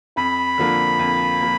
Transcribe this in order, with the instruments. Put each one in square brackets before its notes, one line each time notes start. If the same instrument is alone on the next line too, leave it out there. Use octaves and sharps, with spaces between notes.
[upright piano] F2 [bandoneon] B5
[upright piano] D3 F3 A#3
F2
F3 A#3